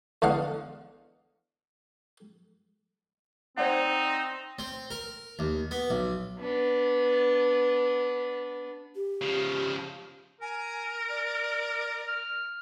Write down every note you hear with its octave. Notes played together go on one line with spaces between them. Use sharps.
E2 D3 D#5 F5 F#5
C4 D#4 C5 D5 F#5
C4
A#4
D#2
B3
B1
B3 D4
G4
C#3 F3
A#4 G#5
D5
F6